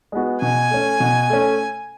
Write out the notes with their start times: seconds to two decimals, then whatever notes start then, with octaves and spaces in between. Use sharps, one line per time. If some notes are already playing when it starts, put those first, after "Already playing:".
0.12 G#3 B3 F#4
0.42 B2 G#5
0.71 A3 C#4
1.00 B2
1.30 A3 C#4